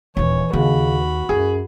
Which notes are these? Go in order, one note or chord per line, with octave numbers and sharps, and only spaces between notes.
D#1 E3 C#4 C#5
D#2 C#3 F#4 B5
C#2 F#2 G#4